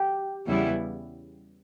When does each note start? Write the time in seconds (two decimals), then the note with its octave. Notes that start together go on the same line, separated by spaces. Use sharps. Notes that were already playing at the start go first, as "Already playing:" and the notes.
Already playing: G4
0.46 E2 C#3 G3 B3 E4